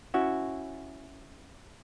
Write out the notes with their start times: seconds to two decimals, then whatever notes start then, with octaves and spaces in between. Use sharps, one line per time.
0.14 C#4 E4 F#4